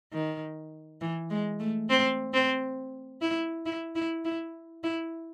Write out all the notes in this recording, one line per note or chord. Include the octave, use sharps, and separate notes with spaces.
D#3
E3
G#3
A3
C4
C4
E4
E4
E4
E4
E4